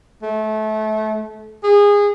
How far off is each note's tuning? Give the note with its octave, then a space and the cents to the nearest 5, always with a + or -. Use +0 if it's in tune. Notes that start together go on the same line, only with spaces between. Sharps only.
A3 -25
G#4 -25